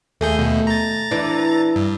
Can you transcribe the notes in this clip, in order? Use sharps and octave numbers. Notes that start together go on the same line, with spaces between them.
D#2 A3 G#4 G6
D#2 B2
A#5 A6
E3 D4
G2